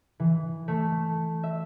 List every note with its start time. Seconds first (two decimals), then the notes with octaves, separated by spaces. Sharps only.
0.20 E3
0.68 A3
1.43 E5